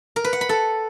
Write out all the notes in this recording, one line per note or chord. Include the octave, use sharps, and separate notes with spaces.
A#4
B4
F#5
B5
A4